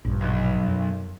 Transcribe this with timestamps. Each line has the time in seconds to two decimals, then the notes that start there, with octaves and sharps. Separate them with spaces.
0.05 A#1 G2
0.21 B1
0.68 F#2